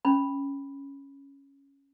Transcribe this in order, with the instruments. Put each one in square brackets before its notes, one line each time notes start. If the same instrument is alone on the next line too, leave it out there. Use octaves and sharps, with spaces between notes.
[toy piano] C#4 B5